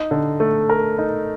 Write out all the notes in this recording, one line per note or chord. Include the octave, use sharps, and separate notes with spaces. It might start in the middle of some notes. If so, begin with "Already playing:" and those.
Already playing: D#4
D3
A3
A#4
D#4